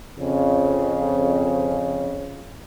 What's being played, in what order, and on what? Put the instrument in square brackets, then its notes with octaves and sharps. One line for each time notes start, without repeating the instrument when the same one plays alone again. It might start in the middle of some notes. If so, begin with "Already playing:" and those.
[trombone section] F2 C#3